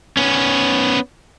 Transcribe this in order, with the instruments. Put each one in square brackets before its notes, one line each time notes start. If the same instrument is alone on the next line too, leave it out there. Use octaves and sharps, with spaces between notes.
[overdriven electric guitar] B3 C#4